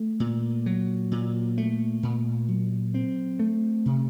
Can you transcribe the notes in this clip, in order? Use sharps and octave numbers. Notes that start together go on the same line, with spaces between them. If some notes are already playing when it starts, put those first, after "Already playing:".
Already playing: A3
A#2
F#3
A#2
A3
A#2
F#3
C4
A3
C3